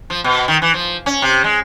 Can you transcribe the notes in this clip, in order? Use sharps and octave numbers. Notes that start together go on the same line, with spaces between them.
F3
B2
D#3
E3
F3
C#4
C3
G#3